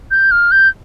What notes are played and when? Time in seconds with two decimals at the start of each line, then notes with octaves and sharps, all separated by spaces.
0.11 G6
0.31 F6
0.51 G6